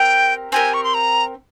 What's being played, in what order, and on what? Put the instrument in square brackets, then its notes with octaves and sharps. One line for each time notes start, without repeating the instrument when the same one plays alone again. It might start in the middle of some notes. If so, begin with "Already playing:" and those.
Already playing: [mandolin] C4 G4 A#4 [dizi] G5
[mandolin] C4 G4 A#4 [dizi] G#5
[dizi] C#6
C6
A#5